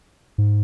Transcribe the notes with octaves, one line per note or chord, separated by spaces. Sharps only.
G#2